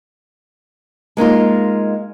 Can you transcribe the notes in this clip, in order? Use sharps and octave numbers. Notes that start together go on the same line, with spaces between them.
G#3 A#3 D#4 F4